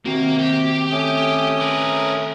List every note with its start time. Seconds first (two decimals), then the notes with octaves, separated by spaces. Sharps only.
0.06 C3 D#3 A#3 C4 F#4
0.39 G4
0.91 A3 C#4 D#6
1.61 A#4 B4